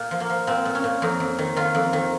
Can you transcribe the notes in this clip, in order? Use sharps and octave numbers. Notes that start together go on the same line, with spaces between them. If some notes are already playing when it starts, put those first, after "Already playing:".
Already playing: A#2
F3
A#3
F3
A#2 C4
A#2
C#4
A#2
F2 D#4
F2
D#3
D#3 F4
F2
D#3